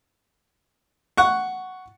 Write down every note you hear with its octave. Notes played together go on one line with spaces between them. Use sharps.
F#5 C#6